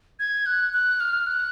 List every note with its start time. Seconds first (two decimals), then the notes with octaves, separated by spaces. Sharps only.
0.19 G#6
0.46 F#6
0.73 F#6
1.00 F6
1.26 F#6